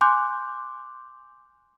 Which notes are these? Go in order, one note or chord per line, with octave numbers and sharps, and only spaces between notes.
G#5 C6 D6 F#6 G6